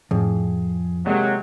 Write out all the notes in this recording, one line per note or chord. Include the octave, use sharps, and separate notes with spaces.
F2 A2 G#4
C3 F#3 G#3 A#3